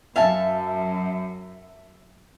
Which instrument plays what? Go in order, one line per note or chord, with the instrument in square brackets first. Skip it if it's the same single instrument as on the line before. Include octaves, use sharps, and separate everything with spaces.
[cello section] F#2 [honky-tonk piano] E5 [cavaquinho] F5 G#5 A5